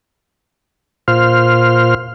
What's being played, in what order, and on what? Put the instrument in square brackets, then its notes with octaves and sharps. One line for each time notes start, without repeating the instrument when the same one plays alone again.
[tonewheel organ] A#2 F4 C5 F6